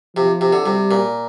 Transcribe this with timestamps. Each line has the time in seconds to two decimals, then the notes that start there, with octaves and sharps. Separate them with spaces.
0.16 C3 F3
0.41 C3
0.53 D3
0.65 C3 G3
0.91 A#2